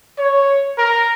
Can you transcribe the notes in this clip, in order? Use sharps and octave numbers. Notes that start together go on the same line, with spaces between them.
C#5
A#4